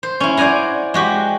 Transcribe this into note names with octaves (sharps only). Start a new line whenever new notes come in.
C5
C#4 E4
C5 D5 F#5 G#5 A#5
G#3 F#4 G4